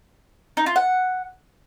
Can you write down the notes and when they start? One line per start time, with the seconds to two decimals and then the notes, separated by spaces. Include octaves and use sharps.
0.57 D#4
0.66 F4
0.76 F#5